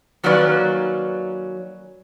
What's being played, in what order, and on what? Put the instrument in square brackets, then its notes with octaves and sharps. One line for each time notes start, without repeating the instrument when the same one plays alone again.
[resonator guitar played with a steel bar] D#3 F#3 A#3 C#4 B4 D5